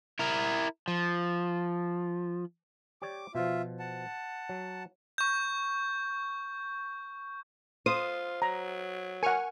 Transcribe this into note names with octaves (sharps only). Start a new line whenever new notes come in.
E4 A#4
F3
G4 C#5 D5 D6
B2 F3 F4 E5
F#5 A5
F#3
C#6 G6
F4 C5 D#6
F#3 A#5
A#4 F#5 G#5 C#6 F6